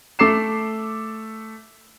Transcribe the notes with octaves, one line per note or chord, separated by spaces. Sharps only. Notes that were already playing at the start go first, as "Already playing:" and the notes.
A3 A4 D6 C7 E7